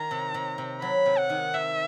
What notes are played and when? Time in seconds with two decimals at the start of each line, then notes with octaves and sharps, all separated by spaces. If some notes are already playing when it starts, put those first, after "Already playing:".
Already playing: D#3 A#5
0.11 C3
0.34 C3
0.58 C3
0.81 F#3 B5
1.06 C3
1.18 F#5
1.30 D#3
1.54 C3 E5